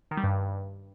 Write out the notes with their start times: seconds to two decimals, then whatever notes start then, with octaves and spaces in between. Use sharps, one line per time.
0.11 D#3
0.17 G3
0.24 G2